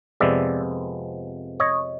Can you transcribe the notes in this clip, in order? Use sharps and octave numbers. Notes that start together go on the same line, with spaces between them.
F2 C3 F3 G#3 B3 D5 E5
C#5 D#5